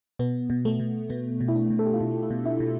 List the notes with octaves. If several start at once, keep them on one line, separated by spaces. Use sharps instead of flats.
B2 B3
B2
A3
B2
B2 B3
B2
E4
D4
B2
A4
G4
F4
B2 E4
E4
B2
E4
B2